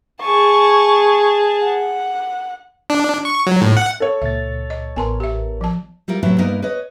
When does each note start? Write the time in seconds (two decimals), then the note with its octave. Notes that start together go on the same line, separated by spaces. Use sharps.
0.22 G#4 A5 C#6
1.64 F#5
2.90 D4
3.25 C#6
3.47 F#3
3.62 A2
3.77 F#5
4.00 A4 C#5
4.22 C#2 A#2 E5 A6
4.70 D#5
4.96 A1 B3 A#4 G#5 A5 C6
5.20 G4 E5
5.61 F3 A5
6.08 G3 E4 F4 A#4
6.23 A2 C3 F#3 A3 B3 E4
6.38 G2 A#3 B3 D#4 E4 A#4
6.62 B4 C#5 D#5